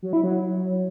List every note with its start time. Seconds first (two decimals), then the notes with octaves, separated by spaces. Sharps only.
0.02 F#3
0.13 E4
0.24 F#3